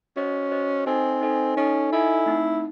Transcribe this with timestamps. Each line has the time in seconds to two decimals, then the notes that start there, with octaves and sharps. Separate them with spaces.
0.16 C#4 F#4 C5 D#5
0.51 F#4 C5 D#5
0.86 C4 D#4 A4 D#5 G#5
1.21 D#4 A4 D#5 G#5
1.57 C#4 D#4 A4 D#5 G#5
1.92 D#4 E4 A4 D#5 G#5
2.26 A3 C4 D#4